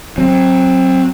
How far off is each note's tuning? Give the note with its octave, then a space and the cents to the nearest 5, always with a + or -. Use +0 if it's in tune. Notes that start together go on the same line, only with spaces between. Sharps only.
F#3 +0 C4 +20